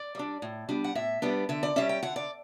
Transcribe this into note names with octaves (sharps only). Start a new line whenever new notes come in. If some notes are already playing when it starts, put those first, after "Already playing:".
Already playing: D5
G3 D4
A2
G3 B3 D4
F#5
A2 E5
G3 B3 D4
D3 E5
D5
G3 C#4 E5
G5
D3 F#5
D5